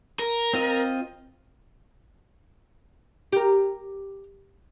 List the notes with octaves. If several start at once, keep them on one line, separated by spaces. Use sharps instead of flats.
A#4
C4 F4 D#5
G4 A#4